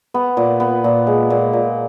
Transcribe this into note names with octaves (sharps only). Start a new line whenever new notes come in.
B3
A#2
B3
A#2
G#3
A#2
A#2